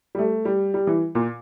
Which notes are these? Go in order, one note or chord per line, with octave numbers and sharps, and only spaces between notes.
G3
A3
G3
G3
E3
A#2